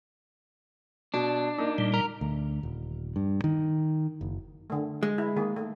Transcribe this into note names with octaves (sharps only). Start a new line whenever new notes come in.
B2 D4
A#3 D#4
A#2 G3
A#4
D2
D#1
G2
D#3
F#1
D3 A3
G#3
E4
D#3 A#3 G#4
A3